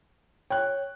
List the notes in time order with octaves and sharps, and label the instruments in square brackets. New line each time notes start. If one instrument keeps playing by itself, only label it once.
[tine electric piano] C#5 [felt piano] G5 F#6